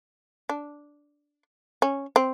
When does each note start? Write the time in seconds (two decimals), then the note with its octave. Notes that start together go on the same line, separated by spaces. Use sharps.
0.49 D4
1.82 C#4
2.16 C4